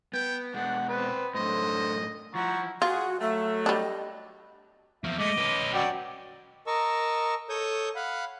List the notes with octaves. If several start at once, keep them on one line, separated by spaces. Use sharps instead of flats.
B3 G5
B2 G#3 D4 F#5
B3 C4 B4
F#2 A2 D3 C5 D#5
F3 E4 F#5 A#5 C#6
F4 F#4 G#4
F#3 A3 E5
G3 D4 D#5
E2 F3 E5
G#3 A3 D#5 D6
C#4 B4
F#3 F#4 D5 G5
A#4 D#5 A5 C#6 E6
A4 C#5 C#6 D#6 G6
F5 F#5 B5